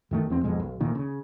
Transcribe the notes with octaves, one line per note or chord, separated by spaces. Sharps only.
F#2 D#3 A3
E2 C4
G1 F2 B2 G#3
B1
D2 A#2 D#3
C#3